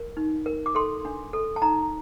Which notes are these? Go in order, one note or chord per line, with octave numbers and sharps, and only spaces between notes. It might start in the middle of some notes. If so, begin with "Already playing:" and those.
Already playing: A#4
D#4
A#4
D6
A4 C6
D4
A4
A5
D#4 A#5